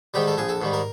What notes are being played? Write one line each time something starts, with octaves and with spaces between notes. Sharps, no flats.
G#2 D#3 G3 G4
A4
A#1 G#4
A4
G#2 D#3 G3
A#4